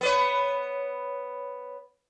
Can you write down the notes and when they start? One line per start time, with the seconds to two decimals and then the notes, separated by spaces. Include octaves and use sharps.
0.01 B3 B4 C#5